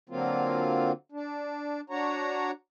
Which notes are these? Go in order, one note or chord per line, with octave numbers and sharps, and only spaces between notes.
D3 F#3 A#3 C4 F4
D4
D4 F#4 C#5 A#5